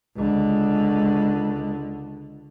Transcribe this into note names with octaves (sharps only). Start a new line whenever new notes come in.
C#2 D3